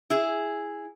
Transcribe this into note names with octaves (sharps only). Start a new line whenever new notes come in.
E4 G#4